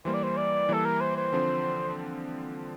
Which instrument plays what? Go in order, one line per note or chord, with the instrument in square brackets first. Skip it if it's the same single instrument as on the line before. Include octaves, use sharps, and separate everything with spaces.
[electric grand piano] E3 G3 A#3 [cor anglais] C5
[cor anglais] D5
C5
D5
[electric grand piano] E3 G3 A#3 [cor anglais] A4
[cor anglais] A#4
C5
C5
[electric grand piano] D3 F3 C4